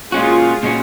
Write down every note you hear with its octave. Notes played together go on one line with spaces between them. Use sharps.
A#2 G#3 C#4 F4 F#4 G#4
A#2 G#3 C#4 F#4